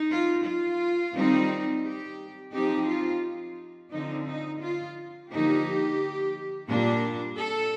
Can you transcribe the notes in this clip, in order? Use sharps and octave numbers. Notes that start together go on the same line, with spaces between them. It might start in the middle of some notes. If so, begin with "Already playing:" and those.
Already playing: D#4
F4
F4
D#3 G3 C4 D#4
G4
F3 C4 D#4 G4
F4
D3 F3 C4 D#4
D#4
F4
D3 F3 A#3 D#4 G4
A#2 G3 A#3 D4
A4